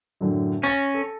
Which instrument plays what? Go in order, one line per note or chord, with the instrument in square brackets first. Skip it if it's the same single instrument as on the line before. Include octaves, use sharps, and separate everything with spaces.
[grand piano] F#2 A2 D3
[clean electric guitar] C#4 [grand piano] C#6 A6 A#6
[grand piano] A4